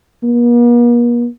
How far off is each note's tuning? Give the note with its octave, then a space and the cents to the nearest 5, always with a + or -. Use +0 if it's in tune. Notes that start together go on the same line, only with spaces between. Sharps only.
A#3 +45